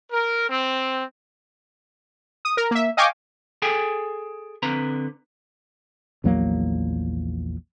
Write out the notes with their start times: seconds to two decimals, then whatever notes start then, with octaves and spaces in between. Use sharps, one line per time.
0.12 A#4
0.50 C4
2.45 D#6
2.57 A#4
2.71 A#3 E5
2.97 D#5 F5 G5 G#5 C#6 D6
3.62 G#4 A4 G5 G#5
4.63 D3 C4 B4 A#5
6.24 A#1 E2 F#3 A#3